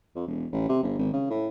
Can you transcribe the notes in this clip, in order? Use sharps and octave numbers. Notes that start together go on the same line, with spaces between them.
F2
E1
A1
C3
G1
G#1
C#3
A2